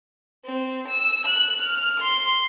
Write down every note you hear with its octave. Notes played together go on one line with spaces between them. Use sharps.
C4
E6
F#6
F6
C6